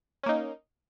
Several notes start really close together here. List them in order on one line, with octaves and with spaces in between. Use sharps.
C#4 A#3 D#4